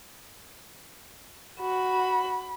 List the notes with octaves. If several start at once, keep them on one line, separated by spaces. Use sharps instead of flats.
F#4 B5